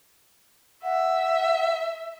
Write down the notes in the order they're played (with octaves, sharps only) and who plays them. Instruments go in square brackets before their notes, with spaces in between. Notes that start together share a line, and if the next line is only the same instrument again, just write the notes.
[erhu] E5 [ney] F#5